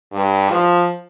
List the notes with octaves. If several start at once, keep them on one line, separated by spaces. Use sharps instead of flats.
G2
F3